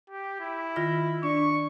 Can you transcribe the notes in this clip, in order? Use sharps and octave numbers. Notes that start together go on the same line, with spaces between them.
G4
E4
D#3 F4 A#6
D4 D5 C#6